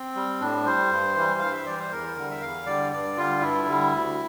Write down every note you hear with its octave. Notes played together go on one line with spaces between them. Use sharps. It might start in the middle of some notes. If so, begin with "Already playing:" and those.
Already playing: C4
G3
A2 D4
G3 C5
G2
E3 G3
G2 F5
E5
E3 G3 D5
C5
E2 A#4
D3 G3
E5
E2 F5
D3 G3 D5
G2 D5
D3 G3 F4
G2 E4
D3 G3
D2